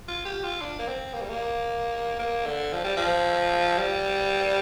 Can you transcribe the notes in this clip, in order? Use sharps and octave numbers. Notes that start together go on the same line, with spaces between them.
F4
G4
F4
D4
A#3
C4
A#3
G3
A#3
A#3
D3
F3
G3
F3
G3